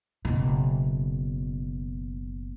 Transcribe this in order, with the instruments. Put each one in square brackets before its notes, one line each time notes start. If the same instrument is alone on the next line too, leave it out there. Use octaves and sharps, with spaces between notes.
[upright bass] F#1 B2